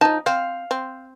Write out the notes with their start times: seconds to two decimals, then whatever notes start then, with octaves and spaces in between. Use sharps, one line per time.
0.01 F3 D#4 A5
0.26 C4 F5
0.71 C4